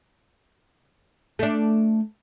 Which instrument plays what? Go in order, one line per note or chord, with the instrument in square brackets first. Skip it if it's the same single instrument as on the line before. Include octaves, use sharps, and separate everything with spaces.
[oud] A3 D4